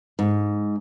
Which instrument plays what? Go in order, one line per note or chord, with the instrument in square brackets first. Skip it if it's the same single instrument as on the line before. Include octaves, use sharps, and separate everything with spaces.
[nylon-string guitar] G#2